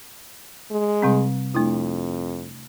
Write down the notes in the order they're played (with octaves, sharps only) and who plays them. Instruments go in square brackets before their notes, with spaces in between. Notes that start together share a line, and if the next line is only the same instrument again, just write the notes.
[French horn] G#3
[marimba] C3 G3 C4
[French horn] F2 [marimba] A3 D4 E4